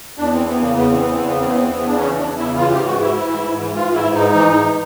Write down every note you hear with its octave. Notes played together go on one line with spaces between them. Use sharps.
E2 D4
E3 C4
E2 B3
C#3 A#3
E2 B3
E3 C4
E2 B3
C4
C#3 B3
E2 C4
E3 B3
E2 C4
B3
C#3 D4
E2 C#4
E3 D4
E2
E4
C#3
E3 F4
G#2 G4
G#2 F#4
E3 E4
E3
G#2
G#2
E3
E3 F4
G#2 E4
G#2
D#4
E3
E3
G#2